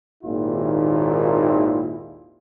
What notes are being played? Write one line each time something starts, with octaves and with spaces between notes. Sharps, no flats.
G#1 D#2 A#2 E4 F4